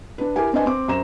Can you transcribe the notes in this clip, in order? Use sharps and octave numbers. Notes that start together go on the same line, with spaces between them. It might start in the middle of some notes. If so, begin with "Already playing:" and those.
D4 B4
E4 G4 A#4 G#5
C4 D4 B4 D#5 G#5
C4 D6
F#2 C5 A#5 E7